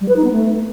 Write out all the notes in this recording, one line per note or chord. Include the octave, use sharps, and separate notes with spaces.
G3
B4
D#4
B3
A3